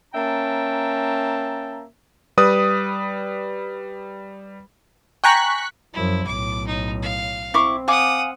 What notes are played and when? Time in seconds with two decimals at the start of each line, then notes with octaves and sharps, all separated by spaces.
0.14 A#3 C#4 E5 G5 A5 A#5
2.38 G3 B4 D#6
5.24 G5 G#5 A#5 C#6 F#6 B6
5.94 F#2 F3 E4
6.27 B1 A2 D6
6.67 D#4
7.02 F5
7.54 C4 E4 C#6 D6
7.88 F5 F#5 G#5 D6 D#6